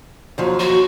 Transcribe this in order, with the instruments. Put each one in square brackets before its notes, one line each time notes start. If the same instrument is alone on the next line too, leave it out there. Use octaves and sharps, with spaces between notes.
[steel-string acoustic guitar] D#2 F3 F#3
[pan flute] F#4